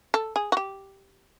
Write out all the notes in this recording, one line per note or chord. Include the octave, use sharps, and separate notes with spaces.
A4
G#4
F#4
G4